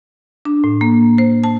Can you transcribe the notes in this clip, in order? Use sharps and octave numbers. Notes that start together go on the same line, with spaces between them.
D4
A2
A#3
C5
A5